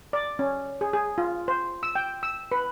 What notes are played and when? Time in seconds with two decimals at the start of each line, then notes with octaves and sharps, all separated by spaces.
0.13 D5
0.39 C#4
0.81 G#4
0.93 G#4
1.18 F4
1.48 C5
1.83 E6
1.95 G5
2.23 E6
2.51 B4